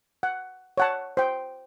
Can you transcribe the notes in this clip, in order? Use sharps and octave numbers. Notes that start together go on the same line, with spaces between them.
F#5
C#5 F#5 A5
C5 G5